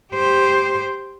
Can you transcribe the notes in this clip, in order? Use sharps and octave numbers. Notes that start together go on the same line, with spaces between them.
G4 C5